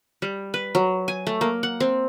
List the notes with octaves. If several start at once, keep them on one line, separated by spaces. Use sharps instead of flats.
G3
B4
F#3
G#5
A3
A#3
F#5
C4